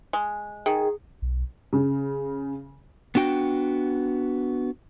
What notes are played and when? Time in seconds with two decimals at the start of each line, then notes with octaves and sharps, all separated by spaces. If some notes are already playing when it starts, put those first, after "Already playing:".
0.13 G#3
0.66 D#3 G#4
1.22 B1
1.73 C#3
3.15 B3 D4 F#4 G5